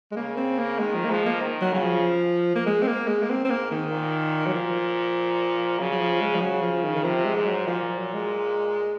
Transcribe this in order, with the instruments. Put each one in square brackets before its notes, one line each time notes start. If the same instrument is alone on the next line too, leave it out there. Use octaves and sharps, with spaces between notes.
[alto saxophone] G#3
[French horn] C#3 [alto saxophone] A#3
[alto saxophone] C4
A#3
[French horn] D#3 [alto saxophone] G#3
[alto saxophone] F3
A#3
[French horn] F3 [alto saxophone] G#3
[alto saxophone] A#3
[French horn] D#3
[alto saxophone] F#3
[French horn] C#3 [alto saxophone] F#3
[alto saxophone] F3
A#3
G#3
C4
A#3
G#3
A#3
[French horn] G#2 [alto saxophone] C4
[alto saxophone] C4
A#3
D#3
[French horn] A#2
[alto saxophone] F#3
F3
[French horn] C#3 [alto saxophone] F#3
[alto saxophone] F#3
F3
G#3
F3
[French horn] C#3 [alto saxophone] F#3
[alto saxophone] F3
D#3
D#3
[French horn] C3 [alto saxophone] F3
[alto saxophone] G#3
[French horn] G#2
[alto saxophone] F#3
[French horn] A#2 [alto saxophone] F3
[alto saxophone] F3
F#3
G#3